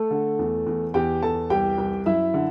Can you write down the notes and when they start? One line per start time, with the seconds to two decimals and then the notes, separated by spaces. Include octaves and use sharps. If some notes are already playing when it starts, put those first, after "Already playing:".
Already playing: A3 A4
0.11 D3
0.39 E2
0.66 E2
0.94 E2 G4 G5
1.22 E2 A4 A5
1.50 C2 G4 G5
1.78 C2
2.06 F#2 E4 E5
2.34 D3